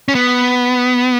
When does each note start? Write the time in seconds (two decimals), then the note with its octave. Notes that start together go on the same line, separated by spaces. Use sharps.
0.08 C#4
0.15 B3